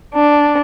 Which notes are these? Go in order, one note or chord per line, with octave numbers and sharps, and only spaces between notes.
D4